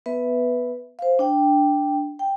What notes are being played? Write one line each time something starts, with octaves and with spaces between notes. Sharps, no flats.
B3 B4 E5
C5 F5
D4 G5
G5